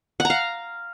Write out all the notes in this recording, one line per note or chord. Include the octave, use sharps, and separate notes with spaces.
F#5
A#5
F5